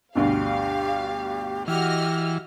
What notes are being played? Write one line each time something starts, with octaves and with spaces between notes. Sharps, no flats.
D2 G2 B2 G4 F5
E3 F#4 G4 D#5 F6